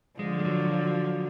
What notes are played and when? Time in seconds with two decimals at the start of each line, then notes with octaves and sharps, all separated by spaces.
0.19 D3 F3 G#3
0.39 G#3
0.45 F#3
0.72 F#3